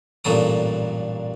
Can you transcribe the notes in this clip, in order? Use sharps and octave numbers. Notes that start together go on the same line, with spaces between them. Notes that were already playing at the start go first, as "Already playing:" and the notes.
A1 G2 A#2 F#3 A4 D#6